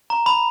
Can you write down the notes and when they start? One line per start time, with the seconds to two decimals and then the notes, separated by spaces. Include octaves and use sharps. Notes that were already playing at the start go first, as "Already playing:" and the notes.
0.10 A#5
0.26 B5